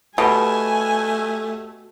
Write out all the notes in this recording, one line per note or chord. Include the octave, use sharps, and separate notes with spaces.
B2 A3 G4 G#5 A5 G7